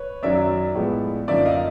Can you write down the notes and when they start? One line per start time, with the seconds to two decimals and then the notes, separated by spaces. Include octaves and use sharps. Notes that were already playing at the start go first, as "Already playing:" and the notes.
Already playing: B4 C#5
0.23 F#2 D#3 F#3 D5 E5
0.75 A2 F3 G#3 B3
1.28 F#2 D3 F3 A#3 D#4 D5 E5
1.45 D#5 F5